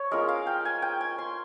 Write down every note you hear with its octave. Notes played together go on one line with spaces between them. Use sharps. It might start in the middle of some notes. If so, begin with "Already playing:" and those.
Already playing: C#5
G#3 C#4 F4 A#4
F5
G5
G#5
G5
G#5
C6